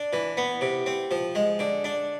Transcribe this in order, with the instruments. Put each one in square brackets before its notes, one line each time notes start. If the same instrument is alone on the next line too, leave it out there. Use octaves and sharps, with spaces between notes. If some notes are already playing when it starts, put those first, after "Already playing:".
Already playing: [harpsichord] D4
E3
B3
C3
C4
F3
G#3
D3
D4